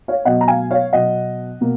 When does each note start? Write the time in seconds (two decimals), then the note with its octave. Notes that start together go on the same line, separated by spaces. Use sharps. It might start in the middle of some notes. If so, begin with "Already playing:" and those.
0.08 C#5 F5
0.25 B2 F#3 B3 D#5 F#5
0.41 A#5
0.48 F5 G#5
0.70 C#5 F5
0.93 B2 F#3 B3 D#5 F#5
1.61 B2 A#3